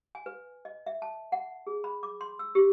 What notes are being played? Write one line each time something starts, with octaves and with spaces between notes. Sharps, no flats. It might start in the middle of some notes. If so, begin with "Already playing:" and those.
G#5
B4
D#5
E5
A5
F#5
G#4
B5
D6
C6
E6
G4